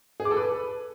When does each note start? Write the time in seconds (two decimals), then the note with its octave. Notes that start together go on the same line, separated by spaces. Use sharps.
0.20 G#4
0.25 D6
0.31 A4
0.37 B4